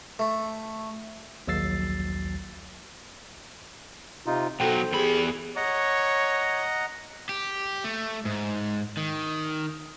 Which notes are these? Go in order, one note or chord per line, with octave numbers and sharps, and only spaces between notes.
A3
A#1 D#2 F#3 E6 A6 C7
C3 D#4 F4
B1 F#3 D#4 A4 C5 G5
E2 G4 G#4 A#4 B5
C#5 D#5 F#5 A#5
G4
A3
G#2
D#3